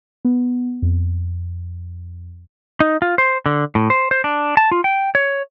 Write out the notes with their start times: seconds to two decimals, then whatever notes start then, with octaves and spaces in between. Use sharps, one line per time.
0.25 B3
0.82 F2
2.80 D#4
3.02 F4
3.18 C5
3.46 D3
3.75 A2
3.90 C5
4.11 C5
4.24 D4
4.57 A5
4.72 F4
4.84 G5
5.15 C#5